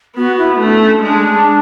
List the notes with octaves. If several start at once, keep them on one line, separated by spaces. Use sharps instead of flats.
B3 F#4
E4
A3 D4
C#4
G#3 D4